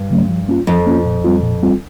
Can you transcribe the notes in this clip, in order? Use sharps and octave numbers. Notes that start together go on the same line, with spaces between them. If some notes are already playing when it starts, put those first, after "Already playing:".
Already playing: G2
C#3 F#3 A3 C#4
F3
A#3 C#4 F4
F2 F3
A#3 C#4 F4
A#2
G3 C4 F4
A#2
G3 C4 F4